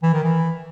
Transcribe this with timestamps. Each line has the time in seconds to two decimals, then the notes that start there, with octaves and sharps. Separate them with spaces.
0.03 E3
0.13 D#3
0.24 E3